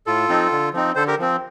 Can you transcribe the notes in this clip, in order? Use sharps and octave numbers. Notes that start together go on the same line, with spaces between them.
A2 F4 A4
F3 C4 D#4
D3
F3 C4 D#4
D3 A4 C5
G4 A#4
F3 C4